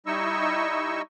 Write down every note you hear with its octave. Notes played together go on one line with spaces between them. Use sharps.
G3 D#4 E4 D#5 C#6 E6